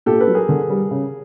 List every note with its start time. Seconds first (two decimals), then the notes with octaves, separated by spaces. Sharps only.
0.06 A#2 G4 A4
0.20 A4 B4
0.27 F#3
0.34 G#4 A#4
0.49 D3
0.70 G3
0.91 C#3